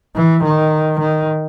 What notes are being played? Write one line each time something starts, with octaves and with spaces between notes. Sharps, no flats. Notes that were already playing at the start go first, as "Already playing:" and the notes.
E3
D#3
D#3